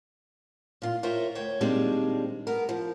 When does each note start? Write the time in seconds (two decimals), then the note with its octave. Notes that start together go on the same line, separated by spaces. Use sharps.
0.82 A#2 F4
1.03 F4 A#4 C5 C#5 E5 G5
1.35 D2 C5 C#5 G5
1.61 A#2 D#3 G3 G#3 C4 D4
2.47 B3 A#4
2.69 F3